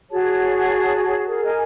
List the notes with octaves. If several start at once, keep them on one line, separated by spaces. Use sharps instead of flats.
F#4 G#4 C#5 A5
G#4 A#4
A#4 D#5 G#5